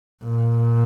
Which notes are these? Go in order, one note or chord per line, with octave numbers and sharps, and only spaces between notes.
A#2